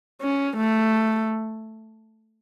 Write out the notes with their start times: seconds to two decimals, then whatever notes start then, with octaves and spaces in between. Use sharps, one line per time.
0.21 C#4
0.57 A3